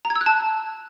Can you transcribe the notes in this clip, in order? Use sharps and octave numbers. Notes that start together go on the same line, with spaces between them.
A#5
G#6
E6
F#6
A5